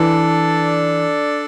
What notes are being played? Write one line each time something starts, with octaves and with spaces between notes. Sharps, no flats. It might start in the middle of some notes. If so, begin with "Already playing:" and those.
Already playing: E3 D4 A4 D5